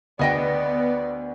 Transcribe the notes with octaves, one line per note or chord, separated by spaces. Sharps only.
D2 B3 G#4 D5 D#5 G5